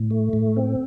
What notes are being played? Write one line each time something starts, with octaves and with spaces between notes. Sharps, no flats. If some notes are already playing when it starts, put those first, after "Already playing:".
Already playing: A2
A3
A2
C4